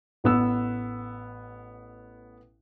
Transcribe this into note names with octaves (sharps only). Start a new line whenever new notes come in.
A1 B3 E6